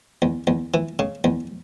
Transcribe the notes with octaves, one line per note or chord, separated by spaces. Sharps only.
E2
E2
E3
C#3
E2